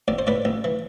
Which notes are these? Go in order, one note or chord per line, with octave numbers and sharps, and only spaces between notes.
A1 D5
C5
A2 B4 D5
A1
E3